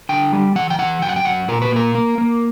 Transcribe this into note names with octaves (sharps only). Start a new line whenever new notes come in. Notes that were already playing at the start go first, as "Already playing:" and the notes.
D3 G5
G3
E3 F#5
G5
E3 F#5
F#2 G5
F#5
G5
F#2 F#5
A#2 A#4
B4
A#3 A#4
A#3
A#3